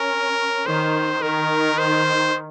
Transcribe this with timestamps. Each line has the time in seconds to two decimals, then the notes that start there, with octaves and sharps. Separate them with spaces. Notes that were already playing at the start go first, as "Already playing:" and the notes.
Already playing: C#4 A#4
0.66 D#3 C5
1.22 D#3 A#4
1.78 C5